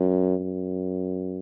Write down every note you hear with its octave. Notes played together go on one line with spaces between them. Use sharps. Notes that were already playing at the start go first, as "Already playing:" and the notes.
Already playing: F#2
F#2